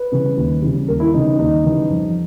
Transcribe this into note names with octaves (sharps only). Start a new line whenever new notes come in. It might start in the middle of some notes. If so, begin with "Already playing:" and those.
Already playing: B4
C#3 E3 G3
D#2
C#3 E3 G3
D#2 A#4
E4
C#3 E3 G3 D#4
D#4
D#2 D#4
C#3 E3 G3
F2